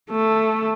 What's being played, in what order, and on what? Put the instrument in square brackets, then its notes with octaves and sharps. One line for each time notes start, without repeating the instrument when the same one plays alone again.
[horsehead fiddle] A3